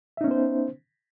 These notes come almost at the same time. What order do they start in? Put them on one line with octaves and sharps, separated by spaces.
E5 D#4 C#4 B3 C5